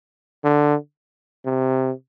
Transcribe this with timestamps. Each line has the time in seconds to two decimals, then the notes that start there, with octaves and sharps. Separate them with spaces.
0.45 D3
1.46 C3